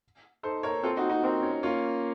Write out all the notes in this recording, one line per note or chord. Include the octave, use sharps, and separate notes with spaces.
D#4 A4 C5
A#4 C#5
C4 F4 A4
D#4 F#4
D#4 F#4
C4 F#4 A#4
C#4
A#3 C#4 F4